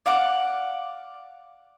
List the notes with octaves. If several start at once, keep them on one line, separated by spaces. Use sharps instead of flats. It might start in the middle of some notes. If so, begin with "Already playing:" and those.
D5 F5 F#5 D6